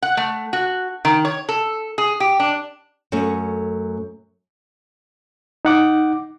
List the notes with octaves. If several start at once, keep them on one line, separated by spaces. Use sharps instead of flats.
F#5
A3
F#4
D#3
C#5
A4
G#4
G4
D4
F#2 A3 C#4
D#4 F#5 D6